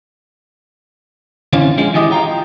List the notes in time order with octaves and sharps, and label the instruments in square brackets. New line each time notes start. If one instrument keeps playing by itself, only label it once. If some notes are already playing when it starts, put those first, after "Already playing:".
[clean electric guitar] D3 E3 C4 C#4 F4
F3 G#3 C#4
D#3 E3 G#3 G4 D#5
F4 G5 A#5